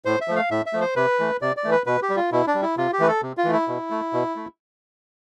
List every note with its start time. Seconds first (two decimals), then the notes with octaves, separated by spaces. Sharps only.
0.05 A2 C5
0.21 E5
0.28 F3 A3
0.36 F5
0.51 A2 E5
0.66 E5
0.73 F3 A3
0.81 C5
0.96 C3 B4
1.19 E3 A3
1.42 C3 D5
1.57 D5
1.64 E3 A3
1.71 B4
1.87 B2 B4
2.02 G4
2.10 G3
2.17 F4
2.32 B2 E4
2.47 D4
2.55 G3
2.62 E4
2.77 C3 F4
2.93 G4
2.99 E3 A3 B4
3.08 A4
3.22 C3
3.37 F4
3.44 E3 A3
3.53 E4
3.68 B2
3.91 A3
4.13 B2
4.36 A3